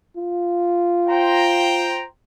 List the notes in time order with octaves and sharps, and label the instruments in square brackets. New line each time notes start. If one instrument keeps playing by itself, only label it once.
[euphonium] F4
[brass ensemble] C5 G5 A#5